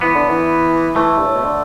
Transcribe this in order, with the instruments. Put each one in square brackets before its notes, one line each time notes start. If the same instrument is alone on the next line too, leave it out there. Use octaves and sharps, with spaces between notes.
[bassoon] E3 [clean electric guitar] B3
[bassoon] D3
E3
[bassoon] E3 [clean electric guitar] A3
[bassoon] G2
A2
B2
D3